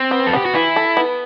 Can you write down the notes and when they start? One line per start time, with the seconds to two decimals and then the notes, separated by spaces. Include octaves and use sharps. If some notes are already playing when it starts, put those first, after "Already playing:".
Already playing: C4
0.11 B3
0.27 A4
0.33 B3 G4
0.45 F#4
0.55 E3 E4
0.76 A4
0.97 B3